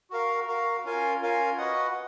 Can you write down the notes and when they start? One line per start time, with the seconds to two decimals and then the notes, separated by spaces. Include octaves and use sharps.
0.10 F#4 A#4 F5
0.47 F#4 A#4 F5
0.84 C#4 F4 A#4 F5 G#5
1.21 C#4 F4 A#4 F5 G#5
1.57 F#4 B4 D#5 F#5